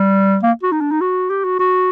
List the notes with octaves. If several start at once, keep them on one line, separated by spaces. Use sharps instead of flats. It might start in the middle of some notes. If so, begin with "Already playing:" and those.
Already playing: G3
A#3
F#4
D#4
D4
D#4
F#4
G4
F#4
F#4